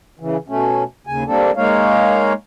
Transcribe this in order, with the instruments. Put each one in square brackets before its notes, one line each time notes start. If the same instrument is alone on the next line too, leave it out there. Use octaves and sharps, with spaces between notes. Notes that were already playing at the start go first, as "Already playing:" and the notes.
[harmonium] C#3 E3
B2 A3 C#4
D#2 C#3 G#5
G3 A#3 C4 D4 A4
G#3 A#3 D#4 C#5 F5